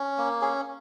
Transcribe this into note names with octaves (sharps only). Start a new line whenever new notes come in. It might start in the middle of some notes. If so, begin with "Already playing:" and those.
Already playing: C#4
A#3
C#4 G#4